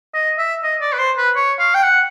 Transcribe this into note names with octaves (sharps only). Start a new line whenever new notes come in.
D#5
E5
D#5
D5
B4
C5
B4
C#5
F5
G5
F#5